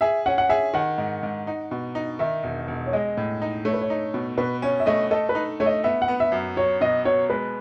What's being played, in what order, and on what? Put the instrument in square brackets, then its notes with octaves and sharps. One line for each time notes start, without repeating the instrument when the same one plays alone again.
[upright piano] G#4 [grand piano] E5
[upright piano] C#4 [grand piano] F#5
[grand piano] F#5
[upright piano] G#4 [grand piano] E5
[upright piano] D#3 [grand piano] F#5
[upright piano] G#2
G#2
D#4
B2
D#4
[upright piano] D#3 [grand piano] E5
[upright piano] E1
E1
[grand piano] C#5
[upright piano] G#3 [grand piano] D#5
[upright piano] A2
D#4
[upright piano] A3 [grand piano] C#5
[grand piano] B4
C#5
[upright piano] D#4
B2
[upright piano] B2 [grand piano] B4
[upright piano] C#4 [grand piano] C#5
[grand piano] E5
[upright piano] A3 [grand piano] D#5
[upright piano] A4 [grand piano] D#5
[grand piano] B4
[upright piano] D#4
[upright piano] A3 [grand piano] C#5
[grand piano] D#5
[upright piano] B3 [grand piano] E5
[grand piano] F#5
[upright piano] B3
[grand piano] E5
[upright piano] F#2
[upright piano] F#3 [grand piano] C#5
[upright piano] B2 [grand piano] D#5
[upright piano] B2 [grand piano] C#5
[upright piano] G#3 [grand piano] B4